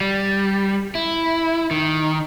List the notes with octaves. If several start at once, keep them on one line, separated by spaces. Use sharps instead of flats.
G3
E4
D#3